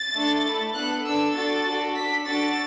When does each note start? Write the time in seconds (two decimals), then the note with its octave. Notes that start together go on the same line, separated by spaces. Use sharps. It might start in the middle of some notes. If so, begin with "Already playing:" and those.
Already playing: A6
0.15 A3 D4 A4
0.45 A3 E4 A4
0.75 B3 D4 A4 F#6
1.05 D4 A4 E6
1.35 D4 F#4 A4 A6
1.65 D4 F#4 A4
1.96 D4 A4 B6
2.26 D4 F#4 A4 A6